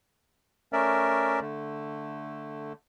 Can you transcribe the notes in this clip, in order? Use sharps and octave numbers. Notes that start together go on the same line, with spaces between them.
A3 C#4 A#4 D5 E5
D3 A3